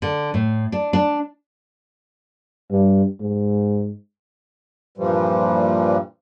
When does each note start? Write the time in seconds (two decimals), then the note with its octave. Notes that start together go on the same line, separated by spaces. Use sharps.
0.02 D3
0.34 A2
0.72 D4
0.93 D4
2.71 G2
3.20 G#2
4.98 G2 A#2 E3 F3 G3